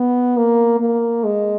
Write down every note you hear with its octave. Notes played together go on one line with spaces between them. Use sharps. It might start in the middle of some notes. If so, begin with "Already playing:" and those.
Already playing: B3
A#3
A#3
G#3